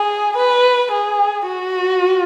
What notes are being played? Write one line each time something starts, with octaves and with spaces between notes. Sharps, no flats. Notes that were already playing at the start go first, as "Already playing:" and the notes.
Already playing: G#4
B4
G#4
F#4